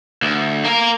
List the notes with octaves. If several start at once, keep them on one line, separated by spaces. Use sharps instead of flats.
D2
A#3 A#4